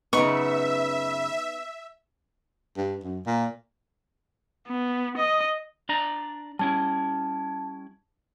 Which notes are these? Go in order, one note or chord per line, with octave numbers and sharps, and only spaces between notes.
F#2 C#3 B3 D#4 E5 C#6
G2
F#2
A#2
B3
D#5
D4 D5 A#5
G3 C#4 E4 A5